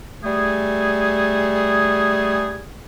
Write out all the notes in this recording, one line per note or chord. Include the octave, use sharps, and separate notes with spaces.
G3 A3 G#4